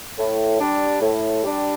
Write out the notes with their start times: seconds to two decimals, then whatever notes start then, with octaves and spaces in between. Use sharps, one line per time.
0.19 A2
0.60 G3 D4
1.02 A2
1.43 G3 D4